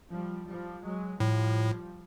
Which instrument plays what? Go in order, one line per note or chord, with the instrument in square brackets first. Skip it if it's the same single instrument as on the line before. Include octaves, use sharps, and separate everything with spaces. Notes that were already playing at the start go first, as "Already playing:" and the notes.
[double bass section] F3 G3
F3 G3
F#3 G#3
[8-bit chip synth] A2 [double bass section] F3 G3